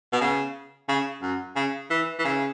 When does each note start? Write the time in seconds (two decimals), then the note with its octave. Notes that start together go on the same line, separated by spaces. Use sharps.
0.13 B2
0.21 C#3
0.88 C#3
1.22 F#2
1.56 C#3
1.90 E3
2.19 E3
2.25 C#3